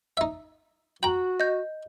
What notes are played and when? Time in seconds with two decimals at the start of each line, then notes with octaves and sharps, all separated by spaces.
0.17 D#4 E5
1.03 F#4 G5 A#5 F#7
1.40 D#5 G6